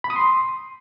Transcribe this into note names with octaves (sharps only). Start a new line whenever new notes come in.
B5
D#6
C6